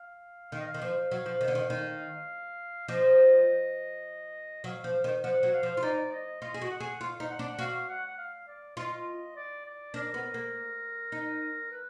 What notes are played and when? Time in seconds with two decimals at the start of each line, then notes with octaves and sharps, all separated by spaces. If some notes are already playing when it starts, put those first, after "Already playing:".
Already playing: F5
0.52 D#3 F5
0.60 D#5
0.67 F5
0.74 D#3
0.82 F3
1.11 F#3
1.26 F3
1.41 D#3
1.48 D3
1.55 D#3
1.70 D#3
2.88 F3 D#5
4.64 F#3 F5
4.84 F3
5.04 D#3
5.24 F3 F#5
5.43 F#3
5.53 F5
5.63 F3
5.77 F4
5.83 D#4 D5
6.12 D#5
6.41 F4 D#5
6.54 G#4
6.61 F#4
6.71 F#5
6.80 G#4
7.00 F4 F5
7.20 D#4
7.30 F#5
7.39 D4
7.59 F#4 F5
7.89 F#5
8.06 F#5
8.18 F5
8.47 D5
8.77 F4 D#5
9.36 D5
9.65 D5
9.94 D4 A#4
10.14 B3
10.34 A#3
11.12 D#4
11.71 B4